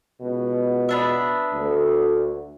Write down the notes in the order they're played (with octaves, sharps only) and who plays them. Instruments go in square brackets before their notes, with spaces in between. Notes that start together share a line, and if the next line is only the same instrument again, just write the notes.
[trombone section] C#2 B2
[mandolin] B3 D4 E5
[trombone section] D2